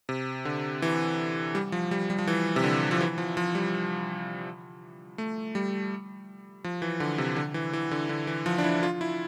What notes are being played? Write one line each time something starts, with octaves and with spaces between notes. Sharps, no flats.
C3
D3
E3
G3
F3
G3
G3
F3
E3
C3
D3
F3
E3
F3
F3
G3
A3
G3
F3
E3
D3
C3
D3
E3
E3
D3
D3
E3
F3
D4
E4
F4
E4